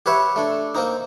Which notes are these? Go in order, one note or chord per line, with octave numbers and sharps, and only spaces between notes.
G4 B4 C#5 E5 F#5
A3 D4
A#3 C4 D#4